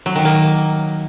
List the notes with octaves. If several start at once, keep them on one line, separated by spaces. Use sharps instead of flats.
F#3
D#3
A#3